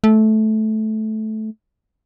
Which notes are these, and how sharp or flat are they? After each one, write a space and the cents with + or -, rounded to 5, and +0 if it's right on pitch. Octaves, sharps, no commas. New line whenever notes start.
A3 -15